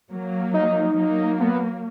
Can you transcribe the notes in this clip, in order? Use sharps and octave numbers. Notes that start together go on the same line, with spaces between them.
F#3 A#3
D#4
F#3 A#3
B3